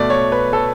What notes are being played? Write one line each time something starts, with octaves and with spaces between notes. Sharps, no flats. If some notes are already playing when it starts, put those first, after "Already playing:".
Already playing: B2 A3 D5
C#5
B4
A4